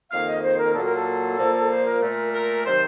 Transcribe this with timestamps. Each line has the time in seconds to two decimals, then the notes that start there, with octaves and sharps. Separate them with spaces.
0.11 F2 D#3 A#3 F5
0.27 D#5
0.43 C5
0.59 A#4
0.74 A#2 F#3 A#3 A4
0.85 A#4
0.96 A4
1.39 A#2 F3 A#3
1.70 C5
1.85 A#4
2.02 A#2 A3
2.33 A#4
2.65 C3 D#3 F#3 C5